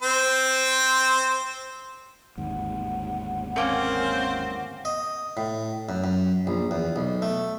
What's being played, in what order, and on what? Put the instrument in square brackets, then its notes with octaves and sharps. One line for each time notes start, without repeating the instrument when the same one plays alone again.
[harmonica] C4 C5
[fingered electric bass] G1 D#2 G#2 [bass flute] F#5
[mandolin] A3 A#3 C#4 [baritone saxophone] C4
[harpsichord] D#5
A2
F#2
F#2
A#1
E2
B1
A3